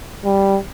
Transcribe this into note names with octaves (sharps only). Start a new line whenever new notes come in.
G3